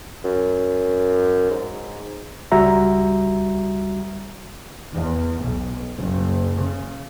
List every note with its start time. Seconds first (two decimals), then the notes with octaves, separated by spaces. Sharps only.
0.24 F#2
1.51 G#2
2.52 C#2 G3 F#4 E5 A#5
4.94 E2
5.41 B1
5.95 F#1
6.57 C#3